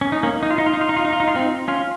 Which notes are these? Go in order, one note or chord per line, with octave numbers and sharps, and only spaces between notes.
C#4
D#4
A#3 C#4
D#4
F4
D#4
F4
D#4
F4
D#4
F4
D#4
F4
D#4
F4
C4 D#4
C#4 F4